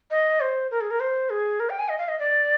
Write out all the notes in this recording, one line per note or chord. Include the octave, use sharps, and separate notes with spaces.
D#5
C5
A#4
G#4
A#4
C5
G#4
A#4
G5
G#5
D#5
F5
D#5
D5